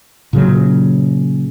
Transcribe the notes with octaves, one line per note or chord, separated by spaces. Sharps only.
A#2 C#3 F#3